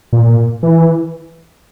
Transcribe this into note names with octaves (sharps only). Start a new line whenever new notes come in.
A#2
E3